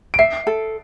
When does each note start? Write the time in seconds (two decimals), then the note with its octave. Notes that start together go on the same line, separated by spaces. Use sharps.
0.14 D7
0.19 E5 C7
0.47 A4